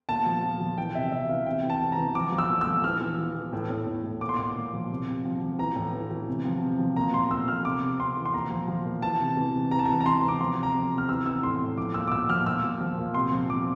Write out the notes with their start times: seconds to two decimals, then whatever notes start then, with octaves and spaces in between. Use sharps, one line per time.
0.09 A#2 A5
0.26 F3
0.43 F3
0.60 F3
0.78 E3 G5
0.95 C3 E5
1.12 C3 E5
1.29 E3 F5
1.46 C3 G5
1.63 E3
1.70 A5
1.81 C3
1.92 A#5
1.98 E3
2.15 F3 D6
2.32 F3
2.39 E6
2.49 A#2
2.61 E6
2.67 F3
2.84 E3 F6
3.01 E3
3.18 E3
3.35 E3
3.53 A2
3.70 A2
3.87 A2
4.04 A2
4.21 A#2 D6
4.29 C6
4.36 A#2 D6
4.56 A#2
4.73 F3
4.90 C3
5.08 C3
5.25 F3
5.41 F3
5.59 E3 A#5
5.76 A2
5.93 E3
6.11 E3
6.28 C3
6.45 F3
6.62 C3
6.79 F3
6.96 A#2 A#5
7.13 F3 C6
7.31 A#2 E6
7.48 F3 F6
7.65 C3 D6
7.82 C3
7.99 C3 C6
8.17 E3
8.25 C6
8.34 A#2 A#5
8.51 F3
8.68 F3
8.85 A#2
9.02 E3 A5
9.20 C3
9.37 E3
9.54 C3
9.71 E3 A#5
9.79 A5
9.86 E3 A#5
10.01 A#5
10.06 E3 C6
10.23 C3 D6
10.40 F3 C6
10.57 C3
10.63 A#5
10.75 F3
10.92 C3
10.98 F6
11.09 E3 E6
11.26 E3 E6
11.43 A2 C6
11.61 A2
11.78 F3 D6
11.94 A#2 E6
12.08 D6
12.12 A#2 E6
12.29 F3 F6
12.46 A#2 E6
12.64 F3
12.81 F3
12.98 A#2
13.14 C3 C6
13.32 F3
13.49 F3 D6